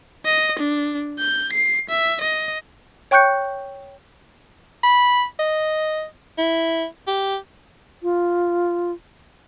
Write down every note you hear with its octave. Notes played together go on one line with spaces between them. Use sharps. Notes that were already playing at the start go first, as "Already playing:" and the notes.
D#5
D4
G6
C7
E5
D#5
C#5 G5 C#6 F#6 G6 C#7
B5
D#5
E4
G4
F4